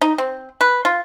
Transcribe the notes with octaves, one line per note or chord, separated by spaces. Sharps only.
D#4
C4
B4
F4